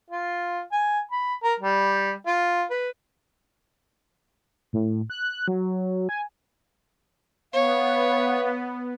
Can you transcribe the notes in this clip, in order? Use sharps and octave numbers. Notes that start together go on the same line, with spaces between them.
F4
G#5
B5
A#4
G3
F4
B4
A2
F#6
F#3
G#5
B3 C#5 F5